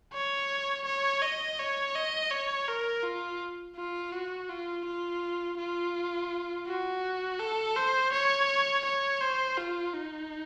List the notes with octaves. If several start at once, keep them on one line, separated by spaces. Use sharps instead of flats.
C#5
C#5
D#5
C#5
D#5
C#5
A#4
F4
F4
F#4
F4
F4
F4
F#4
A4
C5
C#5
C#5
C5
F4
D#4